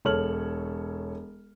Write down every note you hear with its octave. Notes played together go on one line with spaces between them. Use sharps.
E1 A4 C#5 F6 F#7